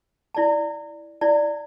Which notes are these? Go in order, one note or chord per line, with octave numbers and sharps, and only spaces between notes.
E4 D5 A5
E4 D5 A5